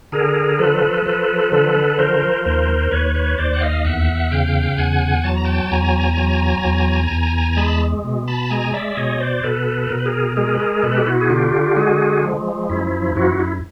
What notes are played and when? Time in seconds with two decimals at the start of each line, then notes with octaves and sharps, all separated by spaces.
0.12 D3 G#4 A#4
0.59 F3 A4 B4
1.05 F3 A4 B4
1.52 D3 A4 B4
1.98 F3 A#4 C5
2.45 D#2 A#4 C5
2.91 D#2 B4 C#5
3.15 B4 C#5
3.38 D#2 C5 D5
3.53 F#5
3.61 D#5 F5
3.85 E2 E5 F#5
4.31 C#3 F5 G5
4.77 E2 F#5 G#5
5.24 F#3 A5
5.35 A#5
5.44 G5 A5
5.71 E2 G#5 A#5
6.17 F#3
6.65 E2
7.11 E2
7.57 G#3 A5 B5
8.04 B2
8.27 A5 B5
8.50 G#3 G#5 A#5
8.74 D5 E5
8.97 B2 C#5 D#5
9.20 C5 D5
9.43 B2 A4 B4
9.90 B2 A#4
9.98 B4
10.06 G#4 A#4
10.37 G#3 G#4 A#4
10.54 B4
10.59 G#4 A#4
10.83 B2 A4 B4
10.96 G4
11.06 E4 F#4
11.21 G#4
11.29 D3 F4 G4
11.76 G#3 F#4 G#4
12.23 F3
12.69 F#2 E4
13.16 F#2 E4 F#4
13.40 E4